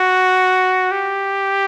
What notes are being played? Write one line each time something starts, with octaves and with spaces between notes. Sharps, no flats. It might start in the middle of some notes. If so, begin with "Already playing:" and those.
Already playing: F#4
G4